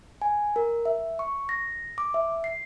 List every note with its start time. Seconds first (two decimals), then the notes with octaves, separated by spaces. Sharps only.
0.22 G#5
0.56 A#4
0.85 E5
1.19 C#6
1.49 A#6
1.98 D6
2.14 E5
2.44 C7